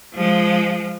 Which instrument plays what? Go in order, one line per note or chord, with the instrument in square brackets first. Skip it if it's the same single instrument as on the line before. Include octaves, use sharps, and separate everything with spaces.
[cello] F3 G#3